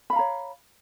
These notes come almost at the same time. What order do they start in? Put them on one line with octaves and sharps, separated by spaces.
B5 F5 A#5 C#5